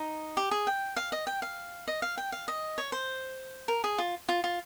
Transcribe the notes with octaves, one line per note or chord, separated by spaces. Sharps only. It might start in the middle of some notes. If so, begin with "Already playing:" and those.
Already playing: D#4
G4
G#4
G5
F5
D#5
G5
F5
D#5
F5
G5
F5
D#5
C#5
C5
A#4
G#4
F4
F4
F4